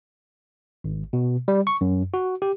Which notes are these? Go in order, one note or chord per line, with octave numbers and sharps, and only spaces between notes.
G#1
B2
G3
C#6
F#2
F#4
G4